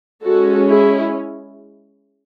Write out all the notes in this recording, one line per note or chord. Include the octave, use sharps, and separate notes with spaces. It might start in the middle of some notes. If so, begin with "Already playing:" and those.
G#3 C#4 F#4 A4
E4 G#4